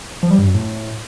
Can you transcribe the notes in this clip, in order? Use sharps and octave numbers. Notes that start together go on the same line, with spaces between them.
F3
G3
G2
F#2
A2